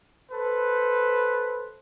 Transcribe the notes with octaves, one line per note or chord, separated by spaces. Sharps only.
A4 B4 C5